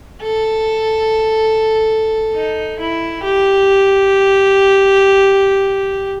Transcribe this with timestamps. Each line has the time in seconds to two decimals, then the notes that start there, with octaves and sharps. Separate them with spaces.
0.22 A4
2.35 D#4
2.80 E4
3.24 G4